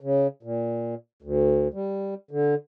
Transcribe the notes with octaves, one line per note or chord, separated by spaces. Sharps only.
C#3
A#2
D2
G3
D3